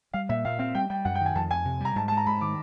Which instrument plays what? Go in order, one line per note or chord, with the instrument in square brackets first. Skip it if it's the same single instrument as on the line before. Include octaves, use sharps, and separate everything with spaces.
[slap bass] G3 [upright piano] F5
[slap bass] A#2 [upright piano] E5
[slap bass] A#2 [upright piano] F5
[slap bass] C4 [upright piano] F5
[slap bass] G3 [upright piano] G5
[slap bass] G3 [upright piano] G5
[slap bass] F#2 [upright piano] F#5
[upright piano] G5
[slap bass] D#3
[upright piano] G#5
[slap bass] F2 [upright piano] A5
[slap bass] F2 [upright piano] G#5
[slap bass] C3
[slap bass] G3 [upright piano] A#5
[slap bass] G#2 [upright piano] A5
[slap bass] G#3 [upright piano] A5
[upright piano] A#5
[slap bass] G#2 [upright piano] B5
[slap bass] D#3 [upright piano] D6